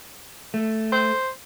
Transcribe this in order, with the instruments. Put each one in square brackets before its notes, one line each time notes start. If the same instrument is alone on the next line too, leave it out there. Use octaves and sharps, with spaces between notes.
[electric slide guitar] A3
[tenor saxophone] C5